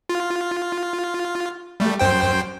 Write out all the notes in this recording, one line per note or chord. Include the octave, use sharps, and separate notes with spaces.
F4
G3 A3
F#2 C5 G5